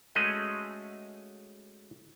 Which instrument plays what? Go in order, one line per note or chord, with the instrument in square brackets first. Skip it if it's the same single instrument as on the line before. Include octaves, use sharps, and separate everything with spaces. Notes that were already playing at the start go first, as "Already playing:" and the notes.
[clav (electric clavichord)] G#3 A3 C#4 F#4 G#4 D#5